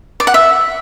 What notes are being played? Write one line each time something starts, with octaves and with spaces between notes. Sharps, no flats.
D5
F#5
E5